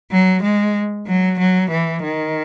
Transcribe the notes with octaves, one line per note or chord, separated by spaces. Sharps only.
F#3
G#3
F#3
F#3
E3
D#3